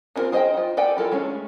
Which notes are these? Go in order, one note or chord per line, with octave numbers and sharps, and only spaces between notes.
C4 D4 F4 A#4 C5
G#4 C5 D#5 F5 G5
D#4 F4
A4 D5 G5 G#5
E4 F4 A4 A#4
G#3 A3 C#4